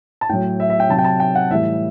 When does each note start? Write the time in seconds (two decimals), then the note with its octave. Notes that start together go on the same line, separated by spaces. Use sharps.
0.21 A5
0.29 A2 F#3 G5
0.60 E5
0.70 E5
0.80 G5
0.90 C3 F#3 A5
0.98 G5
1.04 A5
1.20 G5
1.35 F#5
1.51 A2 E3 G3 E5